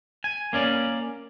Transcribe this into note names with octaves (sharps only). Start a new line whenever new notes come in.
G#5
A#3 C#4 D5